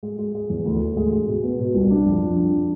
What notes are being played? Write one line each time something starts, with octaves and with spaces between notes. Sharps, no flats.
G#3
G#3
G#3
E2
D2
D2
G#3
G#3
B2
B3
B2
C2
D4
F2
F2
D4